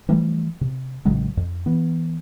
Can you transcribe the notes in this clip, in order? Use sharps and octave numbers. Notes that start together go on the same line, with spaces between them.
E3 F3 G3 A3
C3
A1 C#3 F#3 G#3
F2
E3 B3